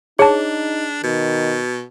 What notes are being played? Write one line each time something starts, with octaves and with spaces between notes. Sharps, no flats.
D4 D#4 G#4 C#5 A5
B2 D#3